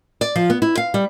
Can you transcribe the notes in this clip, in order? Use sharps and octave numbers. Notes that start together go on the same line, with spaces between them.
D5
F3
B3
E4
F5
G3